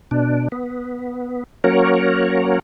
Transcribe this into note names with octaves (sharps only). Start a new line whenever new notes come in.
B2 D4
B3
F#3 A#3 C#4 F#4 A#4 C#5